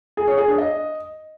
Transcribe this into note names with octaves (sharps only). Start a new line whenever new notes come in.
G#4
C#5
G#4
D4
D#5